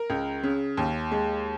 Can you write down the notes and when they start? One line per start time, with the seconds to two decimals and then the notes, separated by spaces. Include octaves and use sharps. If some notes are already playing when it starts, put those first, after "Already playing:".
Already playing: A#4
0.10 C#2
0.43 C#3
0.77 D#2
1.11 G#3